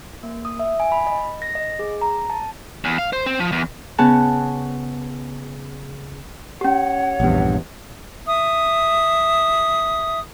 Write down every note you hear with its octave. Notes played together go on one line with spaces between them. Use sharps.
A#3
D#6
E5
G#5
B5
D#5
A#6
D#5
G#4
A#5
A5
E2
F5
C5
C4
F3
E2
C#3 B3 C#4 G#4 F#5 A5
C#4 G4 C#5 F#5
A#1 E2 G2 C3
E5 D#6